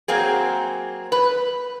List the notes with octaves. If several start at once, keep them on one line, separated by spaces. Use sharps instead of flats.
F#3 A#3 C4 G#4
B4